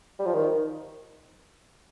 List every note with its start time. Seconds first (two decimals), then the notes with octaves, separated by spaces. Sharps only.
0.19 G3
0.26 F3
0.33 D#3